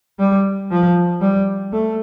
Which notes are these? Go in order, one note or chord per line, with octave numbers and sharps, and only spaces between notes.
G3
F3
G3
A3